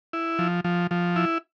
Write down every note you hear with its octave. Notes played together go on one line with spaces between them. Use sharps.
E4
F3
F3
F3
E4